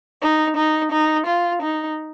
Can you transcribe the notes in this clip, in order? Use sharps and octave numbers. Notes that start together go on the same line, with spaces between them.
D#4
D#4
D#4
F4
D#4